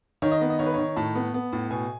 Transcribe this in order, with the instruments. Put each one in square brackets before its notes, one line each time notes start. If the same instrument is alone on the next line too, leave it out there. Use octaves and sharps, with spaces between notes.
[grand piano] D#3 C#5
D#5
B3
D#5
D#3 C#5
B4
D#3 C#5
A2 A5
B3
B3
A2
B2 G#5